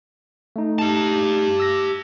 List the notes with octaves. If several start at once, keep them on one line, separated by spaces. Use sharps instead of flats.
A3 D#4
G4 A5
E6 A#6